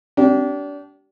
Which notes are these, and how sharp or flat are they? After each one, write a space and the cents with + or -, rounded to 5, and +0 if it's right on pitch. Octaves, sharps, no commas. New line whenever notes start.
D4 -30 G4 -35